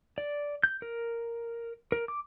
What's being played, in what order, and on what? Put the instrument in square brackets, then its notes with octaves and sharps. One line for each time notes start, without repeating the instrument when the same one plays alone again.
[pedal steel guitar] D5
G6
A#4
A#4
D6